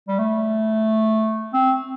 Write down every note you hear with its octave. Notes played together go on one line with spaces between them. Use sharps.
G3
A3
C4